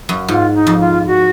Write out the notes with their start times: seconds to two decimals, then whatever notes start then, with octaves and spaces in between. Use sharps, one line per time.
0.09 F#2
0.28 G#2 F4
0.54 D#4
0.67 F2
0.80 F4
1.06 F#4